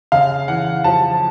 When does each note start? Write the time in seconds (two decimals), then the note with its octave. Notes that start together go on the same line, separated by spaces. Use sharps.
0.12 C#3 F5
0.48 E3 F#5
0.84 F3 A5